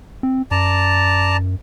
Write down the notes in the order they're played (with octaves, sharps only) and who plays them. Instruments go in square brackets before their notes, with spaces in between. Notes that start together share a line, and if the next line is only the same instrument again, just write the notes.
[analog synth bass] C4
[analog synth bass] F#2 [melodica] D5 A5 A#5